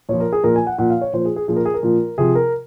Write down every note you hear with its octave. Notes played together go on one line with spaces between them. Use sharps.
A#2 F3 C#5
A#4
G#4
A#2 F3 A#4
G#5
F#5
A#2 F3 F#5
F5
C#5
A#2 F3 C5
G#4
G#4
A#2 F3 G#4
A#4
G#4
A#4
A#2 F3
C3 F3 G#4
A#4